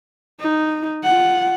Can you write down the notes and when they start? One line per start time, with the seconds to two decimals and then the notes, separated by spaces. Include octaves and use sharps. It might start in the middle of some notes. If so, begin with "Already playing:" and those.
0.41 D#4
1.04 F4 F#5